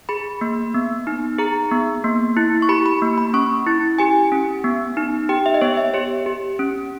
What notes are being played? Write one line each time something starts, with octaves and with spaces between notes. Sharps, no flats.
G#4 B5
A#3
B3
D#4
G#4 A#5
B3
A#3
E4
C#6
G4 B5
B5
A#3
B5
C#4 C#6
E4
G4 G#5
C#4
B3
D#4
G4 G5
E5
D#5
B3 C#5
E5
G4 C#5
G4
C#4